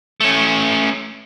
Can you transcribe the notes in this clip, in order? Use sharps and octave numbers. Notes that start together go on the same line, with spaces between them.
A3 C#4